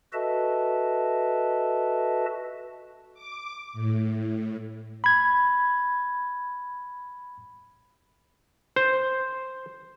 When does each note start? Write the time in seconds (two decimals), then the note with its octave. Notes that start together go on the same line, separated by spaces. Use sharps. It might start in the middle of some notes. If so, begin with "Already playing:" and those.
0.13 F#4 A4 B4 D#5 E5 A5
3.14 D6
3.73 A2
5.04 B5 G#6
8.76 C5